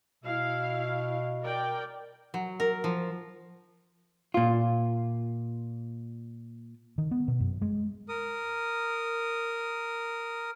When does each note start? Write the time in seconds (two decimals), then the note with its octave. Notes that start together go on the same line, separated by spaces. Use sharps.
0.24 B2 E4 F5
1.42 A#4 D5 G5
2.34 F#3
2.60 A#4
2.84 F3
4.34 A#2 F4
6.98 D#3
7.11 B3
7.28 B2
7.40 F#2
7.62 G#3
8.09 A#4 D#6